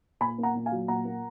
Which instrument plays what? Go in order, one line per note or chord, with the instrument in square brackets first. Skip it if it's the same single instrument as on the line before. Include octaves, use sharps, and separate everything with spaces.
[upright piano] A#2 G#5 B5
A#3
F#5 A#5
A#2
F5 G#5
F#3
A#2 F#5 A#5
A#3